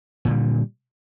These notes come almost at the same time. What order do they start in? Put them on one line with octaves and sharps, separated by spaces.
A#2 D3 G3